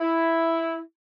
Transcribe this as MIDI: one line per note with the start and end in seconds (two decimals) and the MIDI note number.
0.01 0.79 64